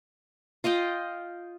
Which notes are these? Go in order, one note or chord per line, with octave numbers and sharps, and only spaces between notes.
F4 D#5 F5 G5